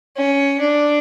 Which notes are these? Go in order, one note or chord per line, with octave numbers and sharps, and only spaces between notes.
C#4
D4